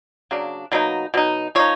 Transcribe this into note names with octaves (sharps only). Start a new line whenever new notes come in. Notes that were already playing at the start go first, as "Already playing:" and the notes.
C#3 F#3 A#3 D4
B2 F#3 A#3 D#4
B2 F#3 D#4
F3 A#3 D#4 C#5